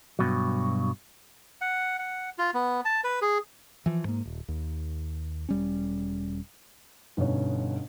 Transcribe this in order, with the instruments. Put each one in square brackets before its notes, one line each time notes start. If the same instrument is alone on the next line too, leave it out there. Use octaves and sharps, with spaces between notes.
[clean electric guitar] G2 B2 F#3
[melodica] F#5
F#5
F4
B3
A5
B4
G#4
[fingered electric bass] E3 F3
G#2 A#3
D#1
D#2
E1 G3 C#4
[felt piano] G1 B2 C#4 D#4 C#5